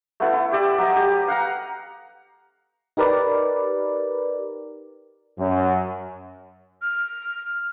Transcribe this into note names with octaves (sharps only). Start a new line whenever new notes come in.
A3 B3 E4 A4
E4
G4 D5 E5
F#3 D#5
G4
F5 F#5 A#5
D#4 G4 A#4 B4 D5
F#2
F6